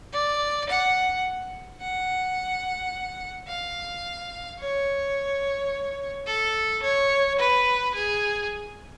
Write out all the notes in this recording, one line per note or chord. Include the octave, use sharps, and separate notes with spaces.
D5
F#5
F#5
F5
C#5
A4
C#5
B4
G#4